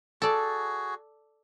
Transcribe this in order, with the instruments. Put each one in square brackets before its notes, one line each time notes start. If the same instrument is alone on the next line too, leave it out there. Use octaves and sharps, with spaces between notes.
[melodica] F#4 G#4 [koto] A4 D5